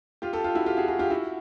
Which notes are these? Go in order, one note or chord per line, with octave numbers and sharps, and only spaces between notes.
F4 G4
G4 A4
F4 G4
E4 F#4
F4 G4
F#4 G#4
F#4 G#4
F4 G4
E4 F#4